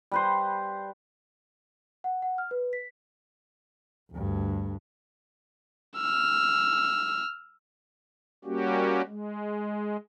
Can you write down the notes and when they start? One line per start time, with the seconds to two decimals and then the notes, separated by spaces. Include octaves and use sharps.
0.12 G3 B4 C5
2.04 F#5
2.22 F#5
2.38 F6
2.51 B4
2.73 B6
4.11 D2 G2
5.97 E6 F6
8.45 G3 A#3 C#4 F#4 G4
9.07 G#3